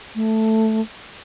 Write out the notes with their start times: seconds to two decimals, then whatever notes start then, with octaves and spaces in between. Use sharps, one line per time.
0.15 A3